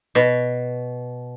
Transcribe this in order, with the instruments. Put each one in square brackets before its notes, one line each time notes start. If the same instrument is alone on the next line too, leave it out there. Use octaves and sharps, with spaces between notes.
[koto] B2